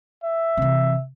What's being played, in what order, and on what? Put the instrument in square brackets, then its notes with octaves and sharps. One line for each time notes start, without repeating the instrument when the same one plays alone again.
[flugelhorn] E5
[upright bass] C3 E3